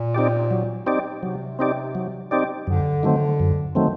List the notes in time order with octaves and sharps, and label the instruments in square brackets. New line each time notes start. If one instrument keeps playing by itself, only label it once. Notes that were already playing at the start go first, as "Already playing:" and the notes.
Already playing: [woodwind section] A#2
[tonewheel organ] C4 D#4 G4 D5
F#3
C4 D#4 G4 D5
[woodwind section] C3 [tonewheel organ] F#3
[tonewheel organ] C4 D#4 G4 D5
F#3
C4 D#4 G4 D5
[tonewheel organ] F#2 [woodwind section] D3
[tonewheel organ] D#3 F#3 A3 C4
F#2
D#3 F#3 A3 C4